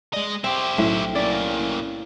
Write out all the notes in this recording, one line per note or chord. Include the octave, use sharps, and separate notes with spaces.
G#3 D5 D#5
C4 E4 G4 C6
B1 A2 C#4 E5
C#3 A#3 D5